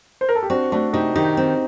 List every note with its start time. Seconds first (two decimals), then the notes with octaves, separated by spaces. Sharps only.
0.21 C5
0.29 A#4
0.35 A4
0.43 G4
0.50 C4 D4 F#4
0.72 A3 D4 F#4
0.93 C3 D#4 G4
1.16 D#3 D#4 G4
1.37 C4